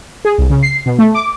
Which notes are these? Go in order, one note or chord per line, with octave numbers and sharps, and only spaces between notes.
G#4
C2
C#3
C7
B2
A3
D6